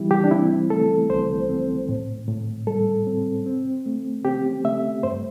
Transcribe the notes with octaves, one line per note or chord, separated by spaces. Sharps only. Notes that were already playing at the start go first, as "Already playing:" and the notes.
Already playing: E3 G3 C4 E4 G4
G4
D4
C4 E4
A3 A4
C2 C5
C4
A2
A2
G3 A4
C4
C4
A3
C4 G4
A3 E5
G2 C5